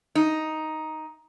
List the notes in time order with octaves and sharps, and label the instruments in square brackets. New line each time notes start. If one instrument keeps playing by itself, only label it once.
[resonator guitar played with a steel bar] D#4